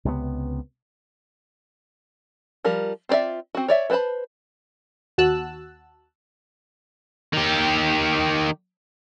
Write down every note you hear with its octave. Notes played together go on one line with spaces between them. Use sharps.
C#2 C3 G#3 B3
F3 G3 A#4
C4 F4 C5 D5 E5
C4 F#4
C#5 D5 E5
B3 B4 C5 A5 B5
D#2 F#4 A5 E6 F#6
D#3 G4